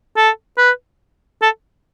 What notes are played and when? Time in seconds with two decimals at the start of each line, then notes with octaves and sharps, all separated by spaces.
0.17 A4
0.58 B4
1.42 A4